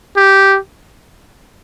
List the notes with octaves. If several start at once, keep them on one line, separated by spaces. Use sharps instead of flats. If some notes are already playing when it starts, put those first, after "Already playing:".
G4